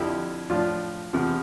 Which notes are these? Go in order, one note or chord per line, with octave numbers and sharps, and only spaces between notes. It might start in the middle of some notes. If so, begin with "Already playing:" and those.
Already playing: F2 D3 F3 E4 G4
A2 F3 D4 F4
E2 C3 F3